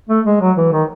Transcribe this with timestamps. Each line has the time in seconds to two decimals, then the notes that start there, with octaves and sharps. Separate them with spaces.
0.09 A3
0.25 G#3
0.41 F#3
0.57 E3
0.72 D#3